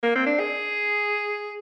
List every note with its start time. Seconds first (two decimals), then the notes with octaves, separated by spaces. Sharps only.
0.03 A#3
0.15 C4
0.26 D4
0.39 G#4